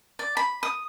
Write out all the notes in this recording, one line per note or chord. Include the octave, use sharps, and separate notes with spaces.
D5
B5
D#6